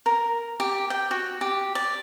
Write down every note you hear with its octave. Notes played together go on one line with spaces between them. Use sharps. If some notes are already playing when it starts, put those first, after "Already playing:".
A#4
G4
G5
F#4
G4
D5